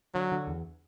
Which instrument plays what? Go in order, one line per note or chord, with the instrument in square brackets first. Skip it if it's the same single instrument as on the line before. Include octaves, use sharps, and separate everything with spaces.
[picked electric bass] D3 [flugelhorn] F#3
[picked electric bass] D3
E2